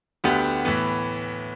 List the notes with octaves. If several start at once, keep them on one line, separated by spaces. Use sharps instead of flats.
D2 D3 B3 G4
A2 E3 B3